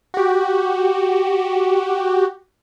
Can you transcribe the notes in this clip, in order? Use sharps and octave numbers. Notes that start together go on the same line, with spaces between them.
F#4 G4